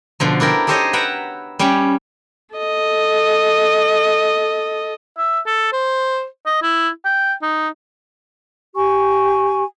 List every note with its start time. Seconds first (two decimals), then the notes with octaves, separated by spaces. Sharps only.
0.20 B2 D3 F3
0.40 D4 E4 A#4 G5
0.67 D#4 G4 A4 C5 C#5 D#5
0.93 B4 E5 F#5 G5 A#5 B5
1.59 G3 C#4 C#5 G5 B5
2.55 A4 D#5
5.18 E5
5.47 A4
5.73 C5
6.46 D#5
6.63 E4
7.05 G5
7.43 D#4
8.75 G4 G#5 C#6